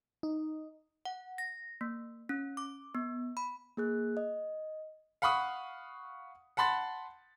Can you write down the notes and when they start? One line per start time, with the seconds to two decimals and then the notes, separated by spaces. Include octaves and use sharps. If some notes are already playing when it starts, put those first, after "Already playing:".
0.23 D#4
1.05 F#5
1.38 A#6
1.81 A#3
2.29 C#4
2.57 D6
2.95 B3
3.37 B5
3.77 A#3 G#4 F#6
4.17 D#5
5.22 F5 F#5 B5 C#6 D#6
6.57 F#5 A5 B5 C6 A6